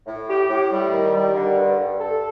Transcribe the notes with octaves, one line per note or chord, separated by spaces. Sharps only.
A2
G4
A2
G3
D#3
G3
D3
G2
G2
A4